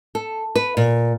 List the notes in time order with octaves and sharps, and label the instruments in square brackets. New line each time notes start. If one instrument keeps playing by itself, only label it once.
[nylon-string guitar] A4
B4
A#2